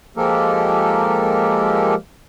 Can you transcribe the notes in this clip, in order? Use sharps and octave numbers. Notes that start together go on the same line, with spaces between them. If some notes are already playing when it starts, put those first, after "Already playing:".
F3 G#3 A#3 G4 A4 A#4